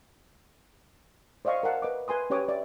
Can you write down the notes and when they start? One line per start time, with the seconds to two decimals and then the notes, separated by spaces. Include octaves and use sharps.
1.45 C5 D5 D#5 F5 C#6
1.63 A#4 F5 F#5 A5
1.82 B4 D#5 D6
2.08 B4 G#5 C6 D#6
2.30 C#4 G4 B4 C#5 D6 D#6
2.49 D5 E5